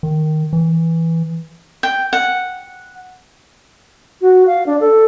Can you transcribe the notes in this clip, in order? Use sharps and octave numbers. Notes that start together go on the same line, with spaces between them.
D#3
E3
G5
F#5
F#4
F5
D4
A4